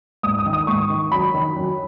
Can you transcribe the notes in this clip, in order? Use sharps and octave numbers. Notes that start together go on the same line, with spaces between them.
G#2 D#6
D#6
D#3
D#6
G#2 C#6
D#3
F#2 B5
D#3
F#2